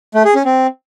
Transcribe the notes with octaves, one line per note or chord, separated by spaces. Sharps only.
A3
G#4
C#4
C4